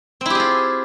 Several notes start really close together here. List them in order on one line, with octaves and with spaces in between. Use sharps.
C4 E4 G4 G#4 F4